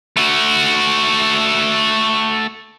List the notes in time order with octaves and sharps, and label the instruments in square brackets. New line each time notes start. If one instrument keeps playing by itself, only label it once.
[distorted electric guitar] A3 F#4